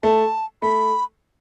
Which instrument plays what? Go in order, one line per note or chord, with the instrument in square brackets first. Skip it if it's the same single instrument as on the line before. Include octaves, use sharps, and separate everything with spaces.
[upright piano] A3 [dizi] A5
[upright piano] A3 [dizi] B5